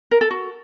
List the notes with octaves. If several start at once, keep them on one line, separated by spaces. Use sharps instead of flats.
A#4
A4
F#4